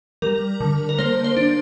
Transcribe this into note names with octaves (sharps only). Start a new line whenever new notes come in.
G3 A#4
D3
A#4
A#3 C5
C5
D4